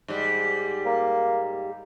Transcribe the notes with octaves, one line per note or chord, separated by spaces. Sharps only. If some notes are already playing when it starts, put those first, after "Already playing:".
G#2 G3
A#3